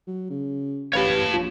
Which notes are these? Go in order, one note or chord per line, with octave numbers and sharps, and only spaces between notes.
F#3
C#3
A1 G4 B4 C#5 F5 A5
A#1 F4